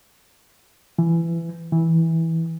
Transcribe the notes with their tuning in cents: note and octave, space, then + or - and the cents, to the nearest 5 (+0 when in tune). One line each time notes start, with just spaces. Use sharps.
E3 +20
E3 -15